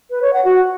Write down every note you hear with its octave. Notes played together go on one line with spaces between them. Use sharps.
B4
C#5
F#5
F#4